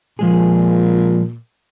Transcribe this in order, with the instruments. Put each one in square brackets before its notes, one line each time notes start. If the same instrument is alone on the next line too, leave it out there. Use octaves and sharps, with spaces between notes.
[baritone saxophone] A#2 [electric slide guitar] F3 G#3 G#4